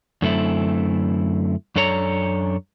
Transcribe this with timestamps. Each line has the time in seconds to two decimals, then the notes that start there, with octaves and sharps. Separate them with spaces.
0.22 F#2 D3 A3 C4 E4
1.76 F#2 D4 A4 C#5 A#5